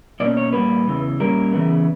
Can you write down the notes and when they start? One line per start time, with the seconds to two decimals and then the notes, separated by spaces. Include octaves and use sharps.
0.20 B2 A#3 C#4 D5
0.37 C#5
0.53 A#2 G3 A#3 B4
0.87 E2 C#3 E3
1.20 A#2 G3 A#3 C#4 A#4
1.53 C#3 E3 B3